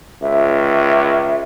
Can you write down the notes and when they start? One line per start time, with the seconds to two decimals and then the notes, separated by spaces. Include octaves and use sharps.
0.22 C#2 E5